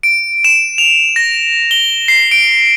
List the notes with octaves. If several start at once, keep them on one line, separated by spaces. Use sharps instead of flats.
D7
E7
F7
A#6
G7
C7
D7